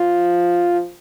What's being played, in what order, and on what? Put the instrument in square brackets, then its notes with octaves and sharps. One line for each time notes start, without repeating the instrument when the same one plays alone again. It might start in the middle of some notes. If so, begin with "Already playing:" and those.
Already playing: [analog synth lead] F3